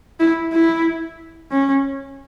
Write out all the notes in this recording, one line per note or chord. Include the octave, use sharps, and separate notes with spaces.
E4
E4
C#4